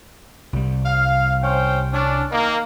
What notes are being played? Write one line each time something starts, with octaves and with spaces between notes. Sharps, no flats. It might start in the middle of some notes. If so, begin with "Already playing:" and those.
C2 C3 G3
F5
C#4 C5 G5
C#4 D4
D#3 A#3